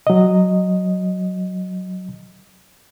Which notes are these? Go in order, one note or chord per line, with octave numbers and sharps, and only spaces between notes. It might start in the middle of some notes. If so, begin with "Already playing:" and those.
F#3 D#5